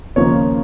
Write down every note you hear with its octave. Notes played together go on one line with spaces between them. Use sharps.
D#2 C#3 F3 A#3 D#4 C#5